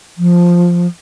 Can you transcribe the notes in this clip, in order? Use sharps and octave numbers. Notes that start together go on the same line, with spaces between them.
F3